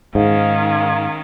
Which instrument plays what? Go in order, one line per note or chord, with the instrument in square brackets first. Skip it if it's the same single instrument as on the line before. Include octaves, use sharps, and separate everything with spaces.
[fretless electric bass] G#2 [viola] D#3 C#4 [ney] F5